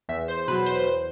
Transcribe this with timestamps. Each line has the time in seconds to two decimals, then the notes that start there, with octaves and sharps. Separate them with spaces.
0.09 E2 E5
0.28 C5
0.48 B2 F#3 B4
0.66 C5
0.85 E2